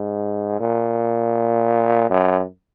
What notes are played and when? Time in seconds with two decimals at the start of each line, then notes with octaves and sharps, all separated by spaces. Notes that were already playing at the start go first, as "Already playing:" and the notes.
Already playing: G#2
0.60 A#2
2.10 F#2